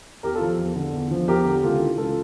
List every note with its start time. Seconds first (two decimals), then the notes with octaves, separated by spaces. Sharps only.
0.23 E2 G4 A#4
0.35 F4 A4
0.41 F3
0.58 E2
0.76 D3
0.93 E2
1.11 F3
1.28 E2 G4 A#4
1.45 D3
1.63 C#2 F4 A4
1.80 E3
1.98 C#2 F4 A4